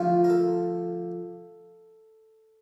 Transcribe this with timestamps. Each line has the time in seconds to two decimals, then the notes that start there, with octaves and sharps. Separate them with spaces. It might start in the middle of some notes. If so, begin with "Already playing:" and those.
Already playing: D3 F3 A3 F4
0.24 A#4
0.30 A4